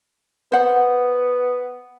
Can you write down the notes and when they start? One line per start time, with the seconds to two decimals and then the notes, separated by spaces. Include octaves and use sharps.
0.52 B3 C5 F#5